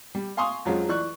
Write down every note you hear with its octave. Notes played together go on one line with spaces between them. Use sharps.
G3
F5 G#5 C6 C#6 D#6
F2 F3 F#3 G#3 C#4
E3 D5 C#6 F#6